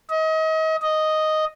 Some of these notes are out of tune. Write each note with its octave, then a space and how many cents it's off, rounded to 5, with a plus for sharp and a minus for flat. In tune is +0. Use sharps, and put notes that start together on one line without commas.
D#5 +35
D#5 +0